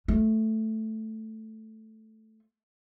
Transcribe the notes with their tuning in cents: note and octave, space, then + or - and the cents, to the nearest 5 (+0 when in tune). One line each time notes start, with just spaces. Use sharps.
A3 +0 F4 +0